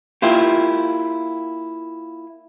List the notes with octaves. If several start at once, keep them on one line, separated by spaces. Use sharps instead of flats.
A#3 E4 F4 G4